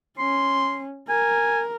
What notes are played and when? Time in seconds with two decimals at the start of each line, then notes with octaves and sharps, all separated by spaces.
0.18 C#4 C6
1.09 A#4 G#5